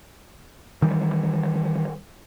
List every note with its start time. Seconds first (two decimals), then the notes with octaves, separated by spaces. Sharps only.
0.82 D#3 E3 G3